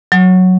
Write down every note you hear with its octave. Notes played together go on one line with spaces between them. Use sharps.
F#3